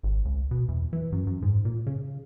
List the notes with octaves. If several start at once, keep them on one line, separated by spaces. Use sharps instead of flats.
G#1
C#2
B2
E2
E3
F#2
F#2
G#2
A#2
C#3